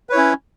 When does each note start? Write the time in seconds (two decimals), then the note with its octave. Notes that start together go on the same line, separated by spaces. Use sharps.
0.10 B4
0.12 C#5
0.15 E4
0.17 C#4